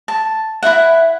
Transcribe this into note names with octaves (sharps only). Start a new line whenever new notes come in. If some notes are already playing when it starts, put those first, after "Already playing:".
A5
E4 F4 E5 F#5